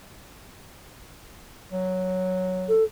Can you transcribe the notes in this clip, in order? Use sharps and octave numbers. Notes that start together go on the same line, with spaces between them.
F#3
A4